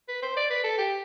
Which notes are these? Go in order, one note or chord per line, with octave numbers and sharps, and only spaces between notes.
B4
C5
D5
B4
A4
G4